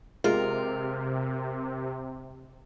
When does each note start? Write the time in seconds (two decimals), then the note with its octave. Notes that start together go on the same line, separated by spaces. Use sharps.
0.24 C3 G#3 F4 A#4